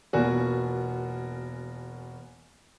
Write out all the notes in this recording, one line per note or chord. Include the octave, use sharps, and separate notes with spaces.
E1 A#3 B3 F4 F#4 G#5